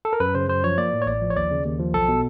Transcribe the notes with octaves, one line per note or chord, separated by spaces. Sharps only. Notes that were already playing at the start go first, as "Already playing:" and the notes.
A4
A#4
F#2 B4
C#3 C5
F#2 C5
F3 C#5
A#3 D5
A2
C#5
A1 D5
F3
C#5
D#2 D5
C#3
D#2
F3
B1 A4
B2